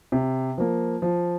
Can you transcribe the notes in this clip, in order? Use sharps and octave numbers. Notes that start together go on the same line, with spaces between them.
C3
F3 A#3
F3